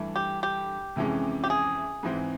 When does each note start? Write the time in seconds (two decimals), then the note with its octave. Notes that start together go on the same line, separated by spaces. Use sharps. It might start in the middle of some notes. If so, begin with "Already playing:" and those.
Already playing: G2 E3 A3
0.16 G4
0.43 G4
0.96 F2 C3 E3 G#3 C#4
1.44 G4
1.50 G#4
2.03 G#2 E3 G#3 C4